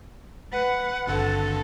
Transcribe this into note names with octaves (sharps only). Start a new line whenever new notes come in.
B4 F#5
G#1 G2 D3 A4